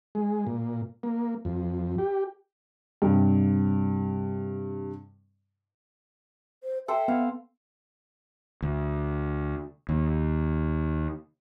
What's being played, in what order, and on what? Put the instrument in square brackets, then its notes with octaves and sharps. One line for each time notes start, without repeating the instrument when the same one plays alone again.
[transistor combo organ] G#3
A#2
A#3
F2
G4
[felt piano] G2 C3
[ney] C5
[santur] A4 C5 G5 [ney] E5
[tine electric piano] B3 [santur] F5
[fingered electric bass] D2
D#2